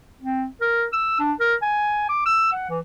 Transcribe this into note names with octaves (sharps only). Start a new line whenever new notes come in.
C4
A#4
E6
D4
A#4
G#5
D6
E6
F#5
E3